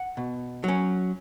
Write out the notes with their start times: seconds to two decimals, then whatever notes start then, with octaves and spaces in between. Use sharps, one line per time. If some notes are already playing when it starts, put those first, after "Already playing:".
Already playing: F#5
0.17 B2
0.64 F#3 C#4